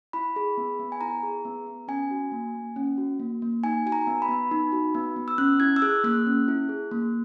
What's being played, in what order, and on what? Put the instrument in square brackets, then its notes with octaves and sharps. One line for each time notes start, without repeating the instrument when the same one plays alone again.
[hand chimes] E4 B5
G#4
B3
B3
G#5
E4 A#5
G#4
B3
B3
C#4 G#5
F#4
A#3
A#3
C#4
F#4
A#3
A#3
D#4 G#5
F#4 G#5
A#5
B3
B5
B3
D#4
F#4
B3
B3
E6
C#4 F#6
E4 G#6
E6
G#4 F#6
A#3 F#6
C#4
E4
G#4
A#3